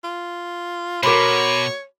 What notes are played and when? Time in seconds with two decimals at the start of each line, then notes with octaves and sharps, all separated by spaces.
0.04 F4
1.03 B2 F#4 A#4 C#5 B5 C6 D6